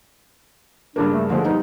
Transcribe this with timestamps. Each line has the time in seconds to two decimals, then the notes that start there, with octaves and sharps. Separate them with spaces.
0.96 G2 C#3 A#3 D4
1.12 A3
1.30 D3 F3 G#3 A3
1.45 G3 B3 D#4